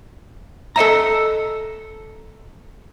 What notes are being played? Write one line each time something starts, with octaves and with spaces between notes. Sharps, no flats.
A4 D#5 E5 A#5